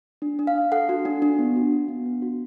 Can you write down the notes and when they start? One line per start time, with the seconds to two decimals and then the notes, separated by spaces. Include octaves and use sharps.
0.22 D4
0.39 D4
0.47 F5
0.55 D4
0.72 A4 F#5
0.89 F#4
1.05 D4
1.22 D4
1.39 B3
1.56 F#4
1.72 D4
1.88 B3
2.05 B3
2.22 F#4